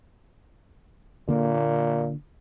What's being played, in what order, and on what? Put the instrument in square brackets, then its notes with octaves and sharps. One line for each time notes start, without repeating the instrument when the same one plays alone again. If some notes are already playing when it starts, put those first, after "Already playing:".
[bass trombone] A#2 [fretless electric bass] D3 A#3